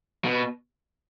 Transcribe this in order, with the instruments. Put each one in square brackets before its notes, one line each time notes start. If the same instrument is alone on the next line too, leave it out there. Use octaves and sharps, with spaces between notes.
[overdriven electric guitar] B2